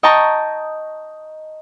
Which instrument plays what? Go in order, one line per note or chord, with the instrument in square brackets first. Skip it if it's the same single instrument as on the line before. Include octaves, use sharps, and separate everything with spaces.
[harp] D#5 G5 A5 A#5 C#6